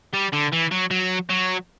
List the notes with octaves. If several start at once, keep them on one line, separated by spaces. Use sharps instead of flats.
G3
D3
E3
F#3
F#3
F#3